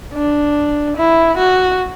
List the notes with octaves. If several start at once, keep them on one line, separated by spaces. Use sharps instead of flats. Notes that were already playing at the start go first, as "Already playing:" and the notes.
D4
E4
F#4